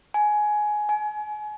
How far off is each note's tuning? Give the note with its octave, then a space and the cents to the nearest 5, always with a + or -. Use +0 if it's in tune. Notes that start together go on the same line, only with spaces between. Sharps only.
G#5 +15
G#5 +30